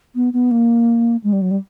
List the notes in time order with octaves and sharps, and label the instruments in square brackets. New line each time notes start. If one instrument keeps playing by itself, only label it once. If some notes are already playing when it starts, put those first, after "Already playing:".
[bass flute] B3
B3
A#3
G#3
G3
F#3
G3